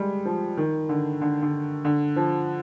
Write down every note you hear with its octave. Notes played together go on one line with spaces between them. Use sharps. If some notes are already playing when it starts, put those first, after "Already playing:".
Already playing: G3 G#3
F3
D#3
D3
D3
D3
D3
F3